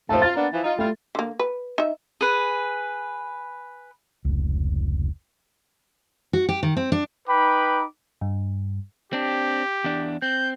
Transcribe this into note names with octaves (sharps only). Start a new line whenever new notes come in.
D#3 F3 A3 C5 A5
F4 A6
A#3 B3 D4
E3 F3 E4
D#4 F4
G3 A3 E4 F4
D3 A#3
B4
D#4 E5
G#4 B4
F1 C#2
F#4
G4
D#3
C4
D4
D#4 B4 G5 B5 D6
G2
C4 D4 G4
E2 D4
C4 G6